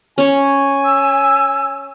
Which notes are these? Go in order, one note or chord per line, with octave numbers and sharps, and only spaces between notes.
C#4 C#5 G#5
E6